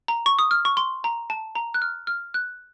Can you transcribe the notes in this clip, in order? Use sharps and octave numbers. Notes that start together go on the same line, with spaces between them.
A#5
C#6
D#6
F6
C#6
C6
A#5
A5
A#5
F#6
F6
F6
F#6